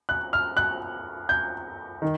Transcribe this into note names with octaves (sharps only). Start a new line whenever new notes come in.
F#6
F6
F#6
G6
D#3